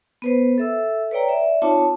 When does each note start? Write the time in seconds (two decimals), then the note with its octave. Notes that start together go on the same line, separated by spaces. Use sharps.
0.22 B3 B4 C5
0.58 A4 E5 E6
1.11 B4 C#5 D5 G5 A#5
1.29 D5 E5
1.62 C4 D#4 F4 C#5 A5 D6